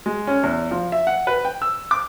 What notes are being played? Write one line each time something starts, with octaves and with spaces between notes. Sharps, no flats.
G#3
C#4
E2
F3
E5
F#5
B4
G5
E6
D6